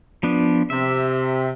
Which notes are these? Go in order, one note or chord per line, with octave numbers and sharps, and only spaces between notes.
F3 B3 D4
C3 E5